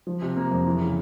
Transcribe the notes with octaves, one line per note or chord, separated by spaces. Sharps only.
F3
C3
A#3
F2
E3
C#3